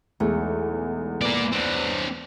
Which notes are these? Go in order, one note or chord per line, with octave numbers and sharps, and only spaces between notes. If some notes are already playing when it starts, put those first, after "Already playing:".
B1 E2 G#3 A3
A#3 B3 D5
C4 D4